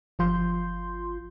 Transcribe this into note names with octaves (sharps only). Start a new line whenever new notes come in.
G1 F3 F4 C6 G6